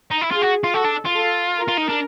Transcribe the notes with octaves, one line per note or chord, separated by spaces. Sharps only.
D#4
E4
F4 G#4
F#4
F4
F#4 A4
D4
F4
A4
A#4
F4
D#4
D4